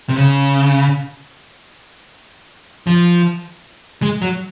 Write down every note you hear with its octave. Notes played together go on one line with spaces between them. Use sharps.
C3
C#3
F3
G#3
F#3